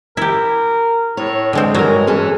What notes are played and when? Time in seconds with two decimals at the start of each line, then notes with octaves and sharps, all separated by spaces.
0.17 E4 G4 A#4
1.17 A2 C#5
1.53 D3 G#3 C4
1.75 G2 F#3 G#3 A#4
2.07 E3 C#4 G#4 A4